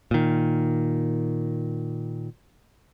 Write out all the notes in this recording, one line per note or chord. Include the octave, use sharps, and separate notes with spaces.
A#2 D#3